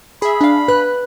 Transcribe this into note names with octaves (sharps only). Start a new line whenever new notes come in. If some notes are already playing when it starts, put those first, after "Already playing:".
G#4 E5 B5
D4 F5
B4 F#6